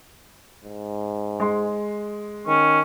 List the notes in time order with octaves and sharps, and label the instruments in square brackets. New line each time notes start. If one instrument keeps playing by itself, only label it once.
[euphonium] G#2
[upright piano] G#3 C6
[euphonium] D#3 [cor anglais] C#4